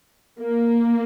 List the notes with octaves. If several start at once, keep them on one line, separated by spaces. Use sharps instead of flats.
A#3